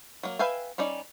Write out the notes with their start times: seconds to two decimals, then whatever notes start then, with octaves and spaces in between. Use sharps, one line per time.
0.23 F#3 A#3
0.39 B4 E5 F5 G5 G#5
0.78 G3 C#4 D#4 D5